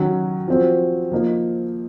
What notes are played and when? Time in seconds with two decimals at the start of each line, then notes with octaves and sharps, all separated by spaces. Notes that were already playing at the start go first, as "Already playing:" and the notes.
Already playing: D#3 F#3 C#4 F#4
0.48 F3 C4 F#4
1.12 F3 A#3 D#4